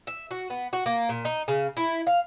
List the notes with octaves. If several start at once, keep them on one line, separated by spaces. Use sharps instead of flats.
E5
F#4
B3
F#4
A#3
A#2
D#4
C#3
E4
F5